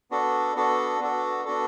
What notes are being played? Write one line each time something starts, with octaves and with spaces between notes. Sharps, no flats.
B3 D4 F#4 A4
B3 D4 F#4 A4
B3 D4 F#4 A4
B3 D4 F#4 A4